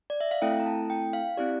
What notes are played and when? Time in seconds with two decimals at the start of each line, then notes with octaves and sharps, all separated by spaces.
0.10 D5
0.21 E5
0.31 F5
0.42 A3 C4 E4 A4 G5
0.60 A#5
0.66 A5
0.90 G5
1.13 F5
1.37 C4 E4 G4 D5